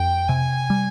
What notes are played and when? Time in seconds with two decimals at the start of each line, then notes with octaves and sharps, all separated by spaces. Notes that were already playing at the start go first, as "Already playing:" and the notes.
Already playing: F2 G5
0.29 C3 G#5
0.70 G3